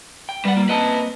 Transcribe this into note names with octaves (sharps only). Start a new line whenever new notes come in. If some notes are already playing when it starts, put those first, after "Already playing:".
G5
G3 B4 F#5
A#3 F4
A#3 C4 B4 D#5 A5